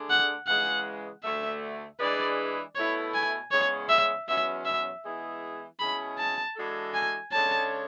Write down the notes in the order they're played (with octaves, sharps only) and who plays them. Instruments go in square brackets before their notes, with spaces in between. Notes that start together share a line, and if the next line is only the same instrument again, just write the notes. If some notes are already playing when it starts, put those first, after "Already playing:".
Already playing: [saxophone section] D3 A3 D4 G#4
[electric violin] F#5
[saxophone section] C#3 E3 G#3 [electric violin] F#5
[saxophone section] D2 D3 A3 [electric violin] E5
[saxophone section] E3 G#3 D4 G#4 B4 [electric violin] D5
[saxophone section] B2 A3 E4 B4 [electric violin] C#5
[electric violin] G#5
[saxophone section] E2 C#3 G#3 C#4 G#4 [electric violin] C#5
[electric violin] E5
[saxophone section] E2 B2 F#3 C#4 [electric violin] E5
[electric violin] E5
[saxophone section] E3 G#3 B3 E4 G#4
[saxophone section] B2 G#3 C#4 E4 G#4 [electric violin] B5
[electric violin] A5
[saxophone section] E3 G#3 D4 F#4 A4
[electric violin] G#5
[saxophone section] C#3 G#3 D4 A4 C#5 [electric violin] A5